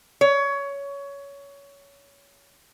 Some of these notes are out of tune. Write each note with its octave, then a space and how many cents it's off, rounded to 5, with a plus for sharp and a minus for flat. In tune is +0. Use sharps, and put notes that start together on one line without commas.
C#5 +20